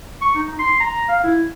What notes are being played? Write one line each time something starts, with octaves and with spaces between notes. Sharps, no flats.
C#6
D#4
C6
A#5
F5
E4